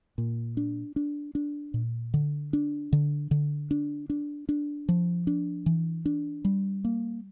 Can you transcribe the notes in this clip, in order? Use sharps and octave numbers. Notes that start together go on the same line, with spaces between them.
A#2
D4
D4
D4
A#2
D3
D4
D3
D3
D4
D4
D4
F3
D4
E3
D4
G3
A#3